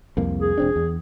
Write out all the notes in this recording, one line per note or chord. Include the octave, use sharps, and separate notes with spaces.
C2 F2 A#3
G#4
E1 C4 D4
E2